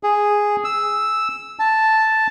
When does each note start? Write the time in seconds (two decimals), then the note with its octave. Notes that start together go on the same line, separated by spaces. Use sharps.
0.03 G#4
0.64 E6
1.59 A5